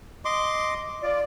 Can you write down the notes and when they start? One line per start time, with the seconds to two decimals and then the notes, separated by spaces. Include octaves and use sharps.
0.25 D#5 C6 D6
1.03 F4 D5